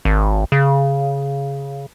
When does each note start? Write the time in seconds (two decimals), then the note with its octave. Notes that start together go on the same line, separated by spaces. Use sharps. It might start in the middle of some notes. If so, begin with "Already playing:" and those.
0.05 G#1
0.52 C#3